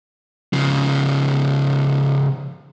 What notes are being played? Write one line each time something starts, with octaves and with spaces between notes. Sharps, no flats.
C#3 F3